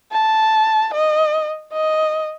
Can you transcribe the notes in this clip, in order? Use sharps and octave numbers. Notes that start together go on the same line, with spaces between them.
A5
D#5
D#5